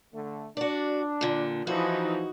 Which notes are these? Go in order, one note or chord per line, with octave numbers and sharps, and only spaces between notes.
D3 A3
D4 F#4 D5
A#2 D3
E3 F3 D#4 F#4